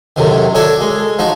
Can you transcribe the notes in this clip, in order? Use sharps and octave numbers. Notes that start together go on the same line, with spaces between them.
F#2 A2 C3 D#3
C#4 D4 F#4 A4 C#5
G#3
F3 D#4 F#4